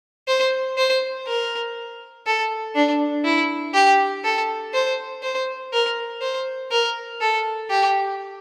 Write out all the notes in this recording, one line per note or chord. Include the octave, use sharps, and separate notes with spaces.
C5
C5
A#4
A4
D4
E4
G4
A4
C5
C5
A#4
C5
A#4
A4
G4